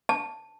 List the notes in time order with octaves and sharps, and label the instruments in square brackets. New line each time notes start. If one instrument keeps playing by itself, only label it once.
[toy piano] A5